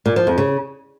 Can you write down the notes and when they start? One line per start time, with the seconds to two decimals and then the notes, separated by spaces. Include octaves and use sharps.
0.06 A#2
0.16 F3
0.27 F2
0.38 C#3